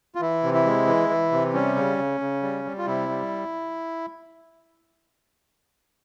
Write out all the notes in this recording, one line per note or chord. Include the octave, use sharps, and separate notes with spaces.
F4
E3 E4
C3
E4
G#3
E3
E3
C3
G3 C#4
C#3
C#3
C#3
G3
G3
F4
C3 E4
G3